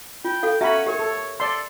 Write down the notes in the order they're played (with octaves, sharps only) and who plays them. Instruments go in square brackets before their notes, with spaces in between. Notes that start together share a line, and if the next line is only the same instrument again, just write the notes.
[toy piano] F4 [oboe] G5
[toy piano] F#4 A4 F5
[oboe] C#4 [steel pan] F#4 B5 [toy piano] E5 A#5
[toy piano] G4 A#4 [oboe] C#5
[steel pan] A4
[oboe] A4 [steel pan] D5 C6